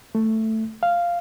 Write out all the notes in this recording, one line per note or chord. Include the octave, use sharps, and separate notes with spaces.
A3
F5